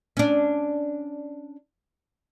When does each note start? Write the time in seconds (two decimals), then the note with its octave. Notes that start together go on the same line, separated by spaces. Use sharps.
0.17 C#4 D4